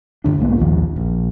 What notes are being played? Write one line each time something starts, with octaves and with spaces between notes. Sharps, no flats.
G2 D3 D4
B1 G#2 A#3 B3
A#1 D#2 D#3 F3
A#1